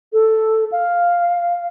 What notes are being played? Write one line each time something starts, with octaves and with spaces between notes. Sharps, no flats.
A4
F5